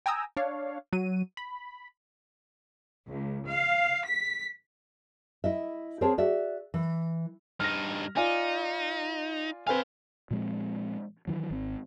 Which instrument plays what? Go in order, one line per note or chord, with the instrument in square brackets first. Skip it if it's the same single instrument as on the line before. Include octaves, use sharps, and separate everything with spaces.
[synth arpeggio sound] G5 G#5 A#5 D#6 E6
D4 C#5 F5
F#3 D#7
B5
[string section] C#2
F5
B6
[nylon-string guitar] E4 D#5 E5
C4 G#4 A#4 C5 C#5 A5
F#4 D5 E5
E3
[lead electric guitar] G2 D#4 [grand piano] F6 A#6
[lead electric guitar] D#4 [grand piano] F4 D5 G#5
[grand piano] C4 B4 G#5 [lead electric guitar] F5 B5
[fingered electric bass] A#2 F3 G#3 C4
D#3 E3 F#3
G#1 C4